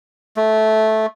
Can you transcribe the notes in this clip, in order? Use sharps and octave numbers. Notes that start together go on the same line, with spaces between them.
A3